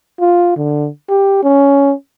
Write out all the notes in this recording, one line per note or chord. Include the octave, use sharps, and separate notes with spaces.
F4
D3
G4
C#4